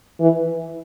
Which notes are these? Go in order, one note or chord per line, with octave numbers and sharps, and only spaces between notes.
E3